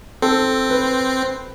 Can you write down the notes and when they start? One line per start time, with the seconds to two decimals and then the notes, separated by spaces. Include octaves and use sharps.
0.22 C4 A4
0.70 B4